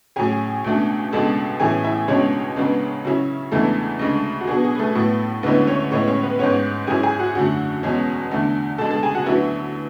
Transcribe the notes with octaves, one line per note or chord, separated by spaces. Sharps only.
A2 F#3 C#4 G#4 G#5
C#2 B2 A3 D4
C#2 B2 G#3 D4 A4 A5
A2 E3 A3 C#4 E4 G#4 G#5
E4 E5
C#2 B2 G#3 C#4 D4 C#5
C#2 C#3 G#3 B3 D4
C#3 F#3 C#4 E4
E2 C#3 E3 G#3 A3 D4 A4
D2 C#3 G#3 D4
F#4
B2 F#3 B3 D4 G#4
G#4
B4
A3 A4
A2 F#3 B3 E4
D2 D3 G#3 B3 C#4 E4 B4
C#4 C#5
A2 G#3 B3 C#4 E4 C#5
C#4 C#5
B3 B4
G#2 G#3 B3 C#4 C#5
G#2 F#3 C#4 E4 G#4 G#5
G#4 G#5
F#4 F#5
F#2 D3 F#3 A3 F#4 F#5
E2 B2 G#3 C#4
E2 D3 A3 D4
B2 G#3 D4 A4 A5
A4 A5
G#4 G#5
F#4 F#5
D2 D3 F#3 B3 E4 E5